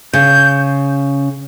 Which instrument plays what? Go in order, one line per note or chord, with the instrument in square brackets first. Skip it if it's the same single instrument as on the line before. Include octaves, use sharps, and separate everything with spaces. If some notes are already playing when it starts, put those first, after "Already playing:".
[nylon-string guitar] C#3 [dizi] G6